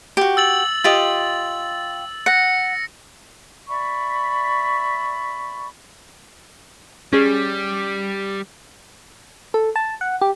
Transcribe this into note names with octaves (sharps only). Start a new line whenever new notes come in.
F#4 G4
E6 A6 F#7
F4 G4 D#5 A6 F#7
F#5 A#6 C#7
D5 E5 B5 C#6
G3 C#4 G#4
A4
A5
F#5
G4